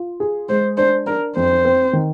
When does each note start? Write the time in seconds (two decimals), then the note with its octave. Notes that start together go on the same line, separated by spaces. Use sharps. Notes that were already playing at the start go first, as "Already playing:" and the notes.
Already playing: F4
0.20 G#4
0.49 G#3 C5
0.78 D4 C5
1.07 D4 A#4
1.36 F2 C5
1.65 C4
1.93 D#3